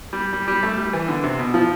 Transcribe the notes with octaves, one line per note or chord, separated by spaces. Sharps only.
G3
G3
G3
A3
G3
E3
D3
C3
B2
F3